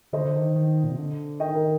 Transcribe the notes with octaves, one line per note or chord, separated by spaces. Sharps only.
D3 C5 D#5
D3
D#3
D#3
A#2
C3
D3
D#3 D#5 G5
A#4